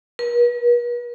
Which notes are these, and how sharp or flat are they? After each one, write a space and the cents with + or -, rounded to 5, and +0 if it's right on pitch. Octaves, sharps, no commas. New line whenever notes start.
B4 -45